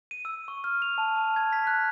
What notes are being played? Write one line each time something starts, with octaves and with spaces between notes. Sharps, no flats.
D#7
E6
C#6
F6
F7
A5
A5
G#6
B6
F#6